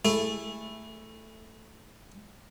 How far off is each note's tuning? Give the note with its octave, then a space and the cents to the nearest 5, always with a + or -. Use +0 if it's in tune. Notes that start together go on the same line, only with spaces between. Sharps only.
A3 +0 E4 +0 G#4 -20